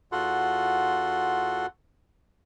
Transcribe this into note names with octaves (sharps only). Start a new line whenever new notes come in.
E2 F4 F#4 A4 F#5 C6